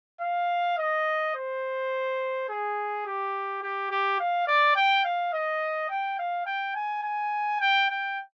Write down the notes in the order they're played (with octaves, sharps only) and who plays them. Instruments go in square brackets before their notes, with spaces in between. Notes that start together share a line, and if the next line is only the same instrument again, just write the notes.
[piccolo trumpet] F5
D#5
C5
G#4
G4
G4
G4
F5
D5
G5
F5
D#5
G5
F5
G5
G#5
G#5
G5
G5